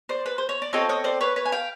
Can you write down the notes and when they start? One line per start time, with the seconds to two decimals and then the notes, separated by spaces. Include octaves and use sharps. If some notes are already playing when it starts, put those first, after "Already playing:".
0.09 C5 D5
0.26 B4
0.38 C5
0.49 C#5
0.62 D5
0.73 C4 F4 A4 C#5 D#5
0.89 C#5 D#5
1.04 C5 D5
1.21 B4 C#5
1.36 B4 C#5
1.46 G#5
1.52 F5 G5